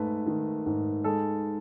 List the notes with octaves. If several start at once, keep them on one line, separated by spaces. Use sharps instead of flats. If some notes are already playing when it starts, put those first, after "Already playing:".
Already playing: G#2 A3 B4
D#3
G#2
G#3 A4